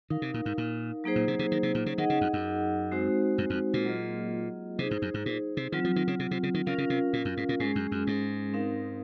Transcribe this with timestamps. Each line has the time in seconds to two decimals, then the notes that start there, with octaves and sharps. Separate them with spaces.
0.10 D#3 D#4 A#4 F5
0.22 C3
0.34 A#2
0.46 G#2
0.58 A#2
1.04 F#3 A#3 D#4 G#4 C5
1.16 A#2
1.28 C3
1.39 C3
1.52 D#3
1.63 C3
1.75 A#2
1.86 C#3
1.98 D#3 D#4 G#4 D#5 F#5
2.10 C#3
2.21 F2
2.33 F#2
2.92 G#3 C4 D#4 F#4 C5
3.38 F#2
3.50 F2
3.74 A#2
3.85 F#3 A#3 F4 G#4 D#5
4.79 C3 D#4 G#4 C5
4.91 G#2
5.02 F#2
5.14 G#2
5.26 A#2
5.57 C3
5.72 D#3 F#3 C4 F4
5.84 F3
5.96 D#3
6.08 C#3
6.19 C3
6.31 C3
6.43 C#3
6.54 D#3
6.66 C#3 C#4 F4 A#4 F5
6.78 C#3
6.90 C3
7.13 A#2
7.25 F#2
7.37 G#2
7.49 A#2
7.60 G#2 G#3 C#4 G#4
7.75 F#2
7.91 F#2
8.07 G#2
8.54 C4 D#4 A#4 F5